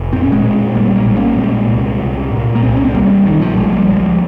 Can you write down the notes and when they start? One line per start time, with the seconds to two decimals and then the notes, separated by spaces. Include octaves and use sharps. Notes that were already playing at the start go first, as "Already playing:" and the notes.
Already playing: F1
0.12 A#2 C4
0.23 C#4
0.32 G#3 C4
0.44 A#2
0.75 A#1 G3 A#3
0.96 G3 A#3
1.07 A#2
1.17 A#3 C#4
1.37 A#2 G#3 C4
1.69 C2
2.00 C2
2.31 A#2
2.55 A#3
2.63 C2 G#3 C4
2.77 C#4
2.85 C4
2.95 C2 G3 A#3
3.25 A#1 D#3
3.41 F3
3.56 A#1 F3 G#3
3.73 G3 A#3
3.89 C#2 F3 G#3